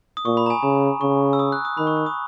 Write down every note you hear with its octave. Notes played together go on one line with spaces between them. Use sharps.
D#6
A#2 C#6
B5
A#5
G#5
C#3 A#5
C#3 C#6
E6
D#6
F#6
D#6
D#3 B5
C#6
C#6
D#6